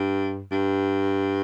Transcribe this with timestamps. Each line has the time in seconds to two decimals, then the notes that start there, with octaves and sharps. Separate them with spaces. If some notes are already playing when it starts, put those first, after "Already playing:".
Already playing: G2
0.52 G2